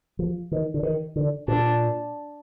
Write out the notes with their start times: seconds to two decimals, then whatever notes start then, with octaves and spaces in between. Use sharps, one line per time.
0.19 F3
0.52 D#3
0.74 D3
0.83 D#3
1.16 D3
1.48 A#2 D4